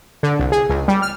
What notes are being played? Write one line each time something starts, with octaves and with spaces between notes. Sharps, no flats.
D3
C2
G#4
C#2
G3
F6